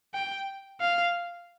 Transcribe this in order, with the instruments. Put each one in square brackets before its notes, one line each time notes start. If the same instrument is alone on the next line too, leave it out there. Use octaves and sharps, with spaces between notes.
[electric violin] G5
F5